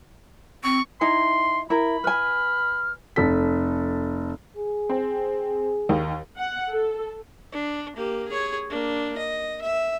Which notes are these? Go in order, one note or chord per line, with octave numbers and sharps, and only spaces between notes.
C4 C#6
D#4 E4 G#5 C6
E4 A#4 B5
B4 G#5 F6
F1 A4 B6
G#4
C4
D#2 D#3
F#5
A4
D4
A#3 G4
G#4 C#5
A#3 D4
D#5
E5